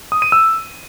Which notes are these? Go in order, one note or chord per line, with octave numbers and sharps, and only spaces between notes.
D#6
D#7
E6